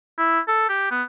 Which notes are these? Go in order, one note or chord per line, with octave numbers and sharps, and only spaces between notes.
E4
A4
G4
B3